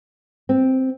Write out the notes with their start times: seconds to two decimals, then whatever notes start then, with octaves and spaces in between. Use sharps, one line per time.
0.49 C4